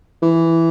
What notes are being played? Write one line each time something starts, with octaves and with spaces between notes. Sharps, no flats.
E3